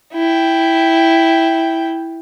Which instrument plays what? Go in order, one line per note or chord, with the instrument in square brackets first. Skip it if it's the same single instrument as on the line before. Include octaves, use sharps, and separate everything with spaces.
[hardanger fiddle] E4 G5